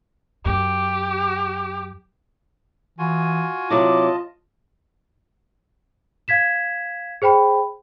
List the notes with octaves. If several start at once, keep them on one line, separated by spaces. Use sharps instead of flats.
F#2 G4
E3 F4 F#4 G#5
C3 F#3 E4 F4 D#5 A5 D6
F5 G#6 B6 E7
G#4 C5 G5 B5